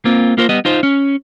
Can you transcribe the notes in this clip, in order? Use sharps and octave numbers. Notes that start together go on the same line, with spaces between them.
A#3 C4 F4
A#3 F4 A#4 C5
G3 B3 D#5
D#4 F4 C5
C#4